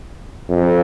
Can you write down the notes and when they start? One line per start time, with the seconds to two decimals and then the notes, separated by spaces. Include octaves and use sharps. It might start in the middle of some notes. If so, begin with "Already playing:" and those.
0.50 F2